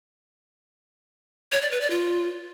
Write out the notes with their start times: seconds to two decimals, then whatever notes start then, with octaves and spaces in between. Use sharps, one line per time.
1.52 C#5
1.62 D5
1.71 B4
1.81 D5
1.90 F4